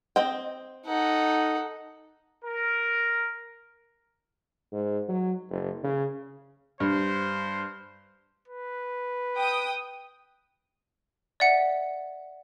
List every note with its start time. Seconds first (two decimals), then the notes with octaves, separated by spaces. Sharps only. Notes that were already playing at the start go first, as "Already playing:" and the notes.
0.16 C4 D#5 G5
0.86 D#4 A4 F#5
2.45 A#4
4.72 G#2
5.08 F#3
5.49 F#1
5.83 C#3
6.80 G2 C5
8.48 B4
9.37 G5 D#6
11.40 D5 E5 F#5 C#7